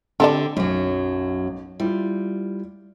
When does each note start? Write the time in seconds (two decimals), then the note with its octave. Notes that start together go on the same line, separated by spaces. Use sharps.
0.20 D3 C4 G4 A4 D5
0.57 B1 F#2 F#3
1.80 G3 E4 F4